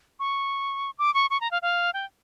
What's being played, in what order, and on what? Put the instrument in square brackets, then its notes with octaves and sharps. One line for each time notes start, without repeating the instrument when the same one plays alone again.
[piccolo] C#6
D6
C#6
C#6
A#5
F5
F5
G5